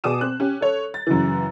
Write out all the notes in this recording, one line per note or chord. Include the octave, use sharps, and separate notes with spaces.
B2 G#4 D5 D6 D#6 E7
C4 F#6
C#4 G4
A4 C#5
A6
F#2 C#3 E3